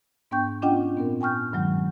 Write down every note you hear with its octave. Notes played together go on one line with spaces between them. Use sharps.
G#2 B3 D4 G5 C#6 G6
C#4 D4 F4 D#5 F#5 G5
A#2 B3 C4 A#4
G5 G#5 C#6 F6 G6
G2 D#3 F#3 G#3